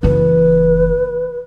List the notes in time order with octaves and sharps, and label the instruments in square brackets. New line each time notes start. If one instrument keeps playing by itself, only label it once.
[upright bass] F#1 E3 [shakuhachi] B4